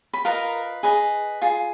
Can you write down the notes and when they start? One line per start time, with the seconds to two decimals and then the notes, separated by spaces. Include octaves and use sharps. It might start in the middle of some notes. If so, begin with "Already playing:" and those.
0.13 B5
0.25 F4 A#4 B4 D#5 A#5
0.83 G#4 B4 D#5
1.42 F4 G#4